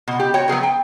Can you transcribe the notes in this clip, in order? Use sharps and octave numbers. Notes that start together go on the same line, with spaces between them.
B2
G4
F#4 C#5 G5
F#3 B3 G#4 A#4
G5